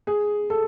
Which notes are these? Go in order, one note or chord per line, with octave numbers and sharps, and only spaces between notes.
G#4
A4